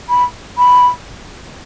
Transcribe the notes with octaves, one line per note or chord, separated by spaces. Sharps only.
B5
B5